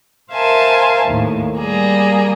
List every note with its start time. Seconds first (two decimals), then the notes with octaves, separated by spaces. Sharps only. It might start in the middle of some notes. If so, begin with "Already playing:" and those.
0.32 A#4 C5 E5 F5 G#5 A5
1.05 D#2 A2
1.58 G3 A#3 G#4